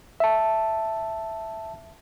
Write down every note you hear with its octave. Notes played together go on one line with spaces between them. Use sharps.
E5 A5